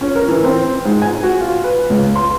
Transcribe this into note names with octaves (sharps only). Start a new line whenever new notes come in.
C#4
A#4
E3
C4
G#2
G#5
F#4
F4
B4
C#2
C6